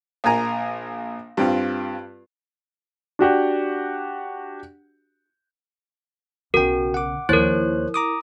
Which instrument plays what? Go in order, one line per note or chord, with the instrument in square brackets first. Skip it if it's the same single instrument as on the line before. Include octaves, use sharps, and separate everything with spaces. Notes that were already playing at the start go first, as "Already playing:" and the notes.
[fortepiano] A#1 A#4 G#5 A#5
G2 C4 F4
[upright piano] D4 F#4 G4 F#5
[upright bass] B1 C#3 [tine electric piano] F#4 G5 [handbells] A#4
[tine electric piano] F#5 D6
[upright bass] D#2 F3 [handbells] E4 A#4 [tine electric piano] C5 C#5 F#6
[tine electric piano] A#5 D6 D#6